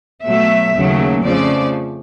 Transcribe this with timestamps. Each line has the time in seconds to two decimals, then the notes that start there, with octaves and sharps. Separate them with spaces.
0.25 B2 F#3 A3 E5
0.74 D#2 C#3 F#3 A3
1.24 F2 C#3 F3 A3 D5